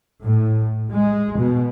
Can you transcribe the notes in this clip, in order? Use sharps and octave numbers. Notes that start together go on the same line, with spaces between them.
A2
G#3
B2